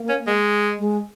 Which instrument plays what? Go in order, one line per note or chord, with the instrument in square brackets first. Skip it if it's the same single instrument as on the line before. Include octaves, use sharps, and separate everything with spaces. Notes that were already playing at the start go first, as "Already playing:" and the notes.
Already playing: [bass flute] A#3
[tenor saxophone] C#4
G#3
[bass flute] G#3